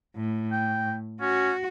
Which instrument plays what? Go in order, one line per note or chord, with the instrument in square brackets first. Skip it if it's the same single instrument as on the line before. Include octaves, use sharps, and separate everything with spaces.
[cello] A2
[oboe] G5
[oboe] C#4 [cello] F#4